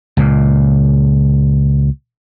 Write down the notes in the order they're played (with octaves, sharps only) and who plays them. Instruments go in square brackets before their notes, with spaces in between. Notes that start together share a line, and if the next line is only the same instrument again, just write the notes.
[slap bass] C#2 A#2